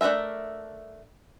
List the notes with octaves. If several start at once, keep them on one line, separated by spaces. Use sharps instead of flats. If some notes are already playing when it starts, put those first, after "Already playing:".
A3 D4 D#4 A#4 E5